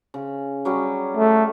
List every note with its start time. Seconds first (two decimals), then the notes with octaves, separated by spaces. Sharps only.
0.14 C#3
0.65 F#3 G3 C#4
1.17 A3